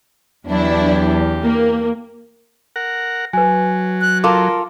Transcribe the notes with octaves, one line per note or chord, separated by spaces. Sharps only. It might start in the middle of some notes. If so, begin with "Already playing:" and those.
E2 F#3 D4 E4 G4
A#3
A#4 F#5
F#3 B4 G#5
F#6
F4 A4 A#4 D6